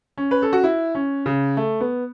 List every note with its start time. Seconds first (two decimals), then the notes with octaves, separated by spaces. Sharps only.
0.18 C#4
0.31 B4
0.42 A4
0.53 F#4
0.64 E4
0.95 C#4
1.26 C#3
1.57 A3
1.80 B3